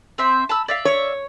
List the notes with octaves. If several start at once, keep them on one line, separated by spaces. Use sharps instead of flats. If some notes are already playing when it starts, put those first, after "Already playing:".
C4 C5 E5
A5 B5 E6
D5 E5 F5
C#5